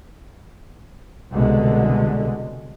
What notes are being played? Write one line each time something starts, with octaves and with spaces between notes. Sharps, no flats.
C2 B2 D3 G#3